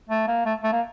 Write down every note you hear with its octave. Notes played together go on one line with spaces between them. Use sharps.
A3
A#3
A3
A3
A#3